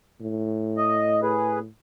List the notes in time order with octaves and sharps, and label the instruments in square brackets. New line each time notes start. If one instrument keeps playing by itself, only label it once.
[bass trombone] A2
[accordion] D#5
G#4 B4